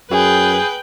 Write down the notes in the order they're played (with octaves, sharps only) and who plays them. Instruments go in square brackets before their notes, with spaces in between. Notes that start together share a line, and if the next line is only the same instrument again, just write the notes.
[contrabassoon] F#2 [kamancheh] G#4 [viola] B4 G5